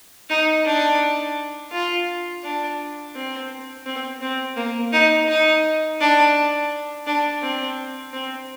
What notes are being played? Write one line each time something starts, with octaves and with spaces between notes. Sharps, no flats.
D#4
D4
F4
D4
C4
C4
C4
A#3
D#4
D#4
D4
D4
C4
C4